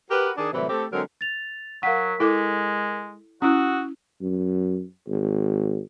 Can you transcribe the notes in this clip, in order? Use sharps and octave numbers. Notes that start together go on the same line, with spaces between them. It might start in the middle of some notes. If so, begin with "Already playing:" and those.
F#4 G4 A#4 B4
D#3 D4 G#4
A2 C3 E3 F#3 G3
A3 C4 G4 A4
D3 F#3 G#3 C4 A#4
A6 F7
F#3 A#4 F5 F#5 B6
G#3 E4 A4 D6
C#4 E4 F#4 D#6 E6 F#6
F#2
G#1